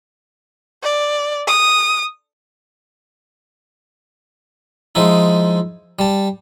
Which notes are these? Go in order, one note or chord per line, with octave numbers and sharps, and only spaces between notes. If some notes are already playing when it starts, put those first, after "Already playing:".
D5
D#6
F3 G#3 D#4 E4
G3 A5